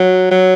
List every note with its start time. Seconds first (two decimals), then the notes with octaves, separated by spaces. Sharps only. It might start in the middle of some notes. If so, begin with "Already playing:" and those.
Already playing: F#3
0.31 F#3